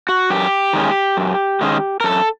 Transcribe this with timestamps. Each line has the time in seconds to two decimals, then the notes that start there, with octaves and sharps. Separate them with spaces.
0.09 F#4
0.30 F#2 G4
0.73 D#3 G#3 C#4
1.17 F#2
1.61 D#3 G#3 C#4
2.00 A#4
2.04 F#2 A4